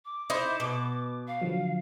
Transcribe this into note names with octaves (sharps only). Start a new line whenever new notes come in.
D6
D#4 E4 C5
B2
F5
D3 F3 F#3